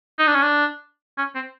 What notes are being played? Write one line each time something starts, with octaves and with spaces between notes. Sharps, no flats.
D#4
D4
C#4
D4
C#4
C4